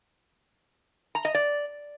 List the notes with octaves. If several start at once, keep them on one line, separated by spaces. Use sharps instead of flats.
A#5
D#5
D5